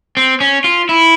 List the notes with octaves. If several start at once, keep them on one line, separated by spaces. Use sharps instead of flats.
C4
C#4
F4
E4